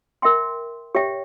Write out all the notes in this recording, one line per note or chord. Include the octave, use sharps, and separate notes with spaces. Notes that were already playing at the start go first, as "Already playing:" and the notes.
A#4 E5 G5 C6
G4 C#5 E5 G5